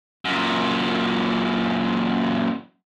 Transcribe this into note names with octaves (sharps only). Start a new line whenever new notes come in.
F#2 A#2